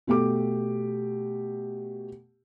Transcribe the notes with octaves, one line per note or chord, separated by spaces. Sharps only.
B2 A3 G4 D6